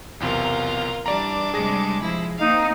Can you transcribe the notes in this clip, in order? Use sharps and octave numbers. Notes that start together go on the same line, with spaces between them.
B1 E2 C3 F4 A#4
E3 G3 D4 D5 A#5 D6
C3 G3 G#3 G#4 A#6
F3 E4
A#3 C4 D#4 F5